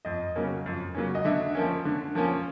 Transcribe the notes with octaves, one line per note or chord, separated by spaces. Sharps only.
F2 D#5
C#3 F#3 A#3 C#4
F2
C#3 F#3 A#3 C#4
D#5
D3 E5
F3 A#3 C#4
D3
F3 A#3 C#4